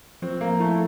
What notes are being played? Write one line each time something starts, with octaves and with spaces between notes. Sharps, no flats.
F3 C4
A#3
A3 E4